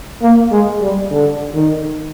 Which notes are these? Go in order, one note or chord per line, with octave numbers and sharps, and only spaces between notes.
A#3
G#3
G3
D3
D#3